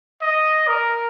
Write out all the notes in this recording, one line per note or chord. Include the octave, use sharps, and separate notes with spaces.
D#5
A#4